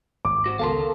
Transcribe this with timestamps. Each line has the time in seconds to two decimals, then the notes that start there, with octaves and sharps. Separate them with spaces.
0.25 G#1 D6
0.46 F#4 C5
0.59 C#2 B3 A4 A#4 F5 A5 C6